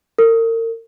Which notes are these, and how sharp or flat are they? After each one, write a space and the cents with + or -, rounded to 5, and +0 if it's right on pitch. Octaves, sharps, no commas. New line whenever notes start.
A#4 -40